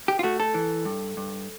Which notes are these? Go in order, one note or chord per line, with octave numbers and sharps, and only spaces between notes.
G4
F4
A3 F#4
A4
E3
G2
G2